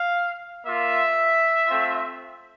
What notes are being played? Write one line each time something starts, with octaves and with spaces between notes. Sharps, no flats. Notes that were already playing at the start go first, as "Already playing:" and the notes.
Already playing: F5
A#3 F4 E5
A3 C4 F4